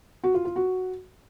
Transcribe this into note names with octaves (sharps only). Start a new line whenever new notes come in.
F#4
F4
F4
F#4